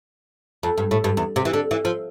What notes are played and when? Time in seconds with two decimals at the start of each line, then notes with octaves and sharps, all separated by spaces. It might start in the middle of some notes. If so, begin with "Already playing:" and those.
0.63 F2
0.78 G2
0.91 A2
1.04 G2
1.17 E2
1.36 C3
1.45 E3
1.54 D3
1.71 E3
1.85 F3